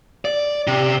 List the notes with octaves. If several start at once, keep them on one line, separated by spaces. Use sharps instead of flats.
D5
C3